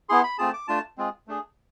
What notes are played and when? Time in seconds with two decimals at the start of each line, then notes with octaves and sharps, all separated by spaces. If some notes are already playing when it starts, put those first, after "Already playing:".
0.09 B3 E4 G#4 C6
0.24 B5
0.38 A3 C4 F4 G#4 A5
0.53 D6
0.68 A3 D4 F4 A5
0.98 G#3 C4 F4 G#4
1.27 A3 D4 G#4